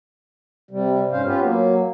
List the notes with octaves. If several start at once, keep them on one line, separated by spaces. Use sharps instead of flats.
C3 G3
G#2 C#4 C5 F5
B3 C#4 F4 G4 B4
F#3 A#3